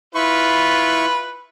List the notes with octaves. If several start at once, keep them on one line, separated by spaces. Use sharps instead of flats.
E4 F4 B4 C#6